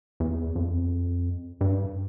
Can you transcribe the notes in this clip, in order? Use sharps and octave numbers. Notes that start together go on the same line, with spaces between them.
E2
F2
G2